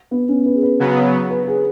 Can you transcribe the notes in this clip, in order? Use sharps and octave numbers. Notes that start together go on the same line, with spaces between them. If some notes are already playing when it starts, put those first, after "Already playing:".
B3
C#4
B4
G#4
B4
C#3 F#3 B3
B4
G#4